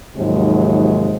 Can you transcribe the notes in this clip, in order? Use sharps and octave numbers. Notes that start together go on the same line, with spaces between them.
D#2 G#2 C3 F3 F#3 G#3